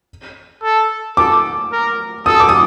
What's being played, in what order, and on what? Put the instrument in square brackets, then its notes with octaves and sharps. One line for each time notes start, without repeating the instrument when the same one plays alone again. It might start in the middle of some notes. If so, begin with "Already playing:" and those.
[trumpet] A4
[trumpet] A4 [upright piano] D6
[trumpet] A#4
[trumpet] A4 [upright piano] D#6
[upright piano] D6
D#6